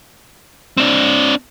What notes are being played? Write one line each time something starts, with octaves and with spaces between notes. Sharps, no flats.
C4 D4